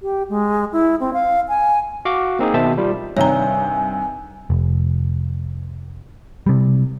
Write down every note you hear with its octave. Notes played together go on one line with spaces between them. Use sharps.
G4
G#3
E4
C4
F5
G#5
F#4 F5 D6
A#3 C4 D#4 G#4
B2 D#3 C5 E5 A5
G3 F4
G2 C3 D#3 C#5 G#5 A#5
F1
C3 G3